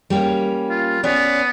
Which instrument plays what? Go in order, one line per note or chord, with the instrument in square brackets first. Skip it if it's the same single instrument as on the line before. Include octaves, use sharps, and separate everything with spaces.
[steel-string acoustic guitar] G3 A#3 C#4
[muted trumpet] F4
[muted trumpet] B3 [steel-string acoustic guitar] C#4 C#5 D5